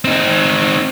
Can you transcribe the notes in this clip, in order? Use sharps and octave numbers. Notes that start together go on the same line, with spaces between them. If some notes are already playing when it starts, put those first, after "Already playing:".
C4 D#4